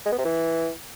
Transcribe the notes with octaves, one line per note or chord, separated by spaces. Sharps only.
G#3
B3
C3
E3